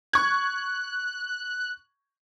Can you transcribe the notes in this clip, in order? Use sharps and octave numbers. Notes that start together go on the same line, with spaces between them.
C#6 F#6 G#6